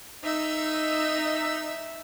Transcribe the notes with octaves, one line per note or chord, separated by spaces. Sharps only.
D#4 E5 E6